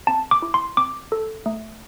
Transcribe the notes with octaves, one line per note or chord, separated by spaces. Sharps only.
C4 A5
D6
E4
C6
C4 D6
A4
A3